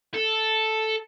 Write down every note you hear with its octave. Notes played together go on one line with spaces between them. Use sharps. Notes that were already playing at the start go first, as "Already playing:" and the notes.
A4